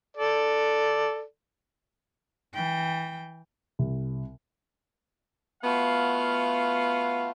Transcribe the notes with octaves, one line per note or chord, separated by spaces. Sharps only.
A4 D5
E3 G5
C2
A3 B3 F4 F#4 F5